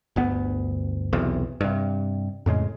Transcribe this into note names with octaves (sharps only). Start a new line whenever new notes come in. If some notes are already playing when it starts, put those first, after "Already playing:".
G1 D2 B3
B1 E2 C3
G2 C3
F2 A2 C#3 G#3